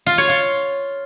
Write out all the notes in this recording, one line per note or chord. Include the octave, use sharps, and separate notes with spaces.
F4
C#5
F4